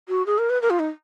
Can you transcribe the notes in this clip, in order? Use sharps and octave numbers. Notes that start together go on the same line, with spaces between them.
F#4
G#4
A#4
B4
A#4
F4
D#4